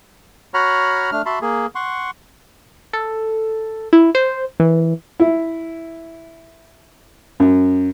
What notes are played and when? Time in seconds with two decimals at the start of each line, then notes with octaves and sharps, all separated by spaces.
0.54 F#4 C#5 F#5 A#5 B5 F6
1.12 A3 D4 F6
1.26 F#4 E5 A5 B5 C6
1.42 A#3 G#4
1.75 F#5 C6 C#6
2.93 A4
3.93 E4
4.15 C5
4.60 E3
5.20 E4
7.40 F#2